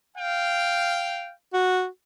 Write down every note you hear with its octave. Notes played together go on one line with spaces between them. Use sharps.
F5 G5
F#4